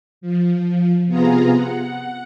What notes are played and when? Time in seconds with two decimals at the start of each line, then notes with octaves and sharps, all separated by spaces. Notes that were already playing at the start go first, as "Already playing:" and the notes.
0.21 F3
1.07 C3 B3 F4 G#4 A#5
1.54 F#5